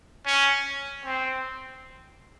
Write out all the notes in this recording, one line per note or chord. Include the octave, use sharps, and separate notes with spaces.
C#4
C4